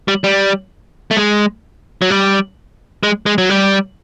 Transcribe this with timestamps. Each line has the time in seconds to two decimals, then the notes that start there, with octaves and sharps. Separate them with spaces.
0.08 G3
0.24 G3
1.11 A3
1.17 G#3
2.02 F#3
2.10 G3
3.03 G#3
3.26 G#3
3.38 F#3
3.49 G3